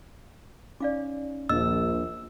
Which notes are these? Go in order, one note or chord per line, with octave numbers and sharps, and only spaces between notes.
C#4 D#4 D5 F5 D6
A#1 D#2 A#3 D4 D#5 E6